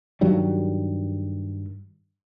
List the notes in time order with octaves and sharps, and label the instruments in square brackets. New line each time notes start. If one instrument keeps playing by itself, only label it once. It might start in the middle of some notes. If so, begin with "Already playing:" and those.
[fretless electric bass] G2 D#3 F#3 G3